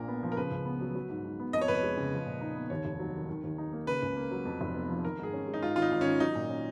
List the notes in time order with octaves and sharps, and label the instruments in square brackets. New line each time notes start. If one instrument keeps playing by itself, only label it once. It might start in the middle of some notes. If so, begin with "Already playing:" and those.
Already playing: [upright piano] A#1 A#2 [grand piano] A#4
[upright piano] B3
F3
[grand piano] A#4
[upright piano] C#3 [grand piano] B4
[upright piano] C#2
B3
F#3
F#3
G#2
G#2
B3
[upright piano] F2 [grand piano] D#5
[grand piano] C#5
[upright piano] F1 [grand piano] B4
[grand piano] C#5
[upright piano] G#3
C#3
F3
A#2
D#4
B3
[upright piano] D#2 [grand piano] C#5
[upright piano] F1
F#3
D#3
D#3
D#2
D#4
A#3
[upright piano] C#3 [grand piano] B4
[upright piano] C#2
A#3
F#3
F2
F1
B3
F3
[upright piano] D#3 [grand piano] A#4
[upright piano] G#2 [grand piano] G#4
[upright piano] C#4
G#3
[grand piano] D#4
[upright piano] G#2 [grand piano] F4
[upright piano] G#1 [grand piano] F4
[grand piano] D#4
[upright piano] G#1
[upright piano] D#3 [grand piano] C#4
[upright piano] F#3 [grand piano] D#4
[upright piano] A#2
C#4